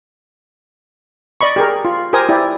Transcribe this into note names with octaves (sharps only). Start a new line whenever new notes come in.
D5 D#5 B5 C#6
G4 G#4 A#4
F4
G4 A#4 C5 G#5 D#6
E4 G4 D5